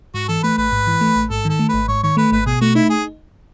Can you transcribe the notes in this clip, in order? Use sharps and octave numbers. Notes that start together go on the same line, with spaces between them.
G#2 F#4
E3 A4
A3 B4
A1 B4
G#2
E3
A3
A1
G#2 A4
D#3 A4
A3
G#1 B4
G#2 C#5
D#3 C#5
A3 B4
G#1 B4
B2 G#4
A3 F#4
D#4 E4
G#4